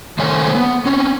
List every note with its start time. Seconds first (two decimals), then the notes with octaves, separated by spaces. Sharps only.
0.19 D#3 A3 C5 C#5 G#5
0.55 B3
0.86 C4 C#4